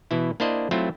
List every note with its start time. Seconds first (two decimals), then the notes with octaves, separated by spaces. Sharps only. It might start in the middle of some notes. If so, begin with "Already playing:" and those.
0.11 B2 E3 E4
0.40 A#3 D4 E4 C5 D5 D#5
0.71 F#3 A3 C4 E4 F4